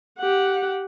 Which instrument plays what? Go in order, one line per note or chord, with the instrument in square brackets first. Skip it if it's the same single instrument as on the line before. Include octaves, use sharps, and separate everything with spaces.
[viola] G4 F#5